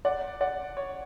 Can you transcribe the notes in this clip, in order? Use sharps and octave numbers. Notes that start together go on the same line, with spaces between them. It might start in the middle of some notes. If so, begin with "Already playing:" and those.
D5 F#5
D5 F#5
C#5